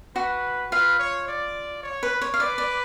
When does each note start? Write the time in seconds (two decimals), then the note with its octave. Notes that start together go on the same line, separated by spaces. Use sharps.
0.16 F#4 B4
0.71 F4 B4 F5
0.99 C#5
1.28 D5
1.83 C#5
2.03 B4
2.22 C#5
2.34 F5
2.40 B4 D5
2.58 D5